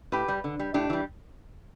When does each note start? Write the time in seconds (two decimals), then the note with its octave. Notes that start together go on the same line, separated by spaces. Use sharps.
0.12 A2 G4 B4
0.28 G3
0.44 D3
0.59 G3
0.74 A2 D4 G4
0.90 E3 G3